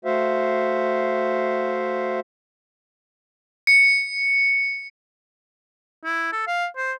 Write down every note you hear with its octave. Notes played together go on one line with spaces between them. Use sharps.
A3 F#4 C5 E5 F5
C#7
E4
A4
F5
C5